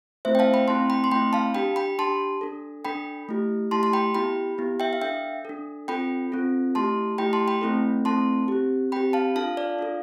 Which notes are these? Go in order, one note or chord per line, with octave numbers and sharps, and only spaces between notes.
A3 C4 E4 C5 E5
G5
F5 A5
G5 B5
A3 C4 E4 A5 C6
G5 B5
C6
A3 C4 E4 G5 B5
F5 A5
D4 G4 G5 B5
G5 B5
D4 G4 A5 C6
D4 A4
D4 A4 G5 B5
A3 E4 G4
A3 E4 G4 A5 C6
A5 C6
G5 B5
B3 E4 G4 G5 B5
B3 E4 G4
E5 G5
F5
D4 A4 E5 G5
D4 A4
C4 F4 A4 G5 B5
C4 F4 A4
A3 E4 G4 A5 C6
A3 E4 G4 G5 B5
A5 C6
G5 B5
A3 C4 E4 A4
A3 C4 E4 A4 A5 C6
C4 G4
C4 G4 G5 B5
F5 A5
D4 F4 A4 F5 A5
D5 F5
D4 F4 A4